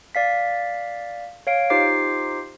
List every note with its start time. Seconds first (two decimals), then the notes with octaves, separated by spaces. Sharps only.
0.15 D5 F5 B6
1.47 C#5 F5 D7
1.70 D#4 F4 G4 C5 D6 C7